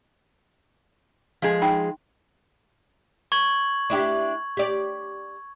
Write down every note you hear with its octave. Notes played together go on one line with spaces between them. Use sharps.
F3 G#3 G#4
D#4 G5
C#6 G#6 F#7
D4 E4 G4
G4 D5